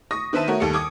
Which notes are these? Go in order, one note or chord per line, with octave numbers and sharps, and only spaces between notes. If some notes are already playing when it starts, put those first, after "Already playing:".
C#6 D#6 A#6
D#3 B4 C5 E5 A5 D#7
A3 F#4 A#4 C#5
D#2 G3 A4 C#7
D6 D#6 G#6